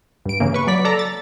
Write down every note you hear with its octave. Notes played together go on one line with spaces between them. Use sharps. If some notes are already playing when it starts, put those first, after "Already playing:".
G2 D7
C#3 E3 A#3
B4 C#6
F#3 D5 B6
A4 D5 A5 A#5
A6